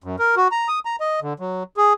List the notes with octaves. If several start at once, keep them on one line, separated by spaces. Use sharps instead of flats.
F#2
A#4
F#4
A#5
D#6
A#5
D#5
D3
F#3
G#4